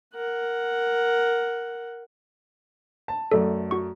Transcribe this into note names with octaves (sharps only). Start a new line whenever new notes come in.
A#4 F#5
A5
F#2 A3 A4 D5
F#4 C#6